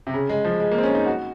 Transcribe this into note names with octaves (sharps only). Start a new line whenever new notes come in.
C3
C#3
G#3
F3
G#3
A#3
C4
C#4
D#4
F#4